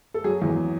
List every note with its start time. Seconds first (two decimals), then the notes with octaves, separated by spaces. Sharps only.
0.14 A4
0.24 F#3 G#4
0.42 E2